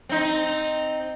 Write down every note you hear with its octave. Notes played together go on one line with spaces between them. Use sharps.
C4 D#4